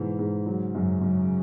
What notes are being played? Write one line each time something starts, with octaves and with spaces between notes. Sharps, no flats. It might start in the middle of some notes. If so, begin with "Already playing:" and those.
Already playing: G#2 B2 E3
G#2
C#3 F#3
F#2
F#2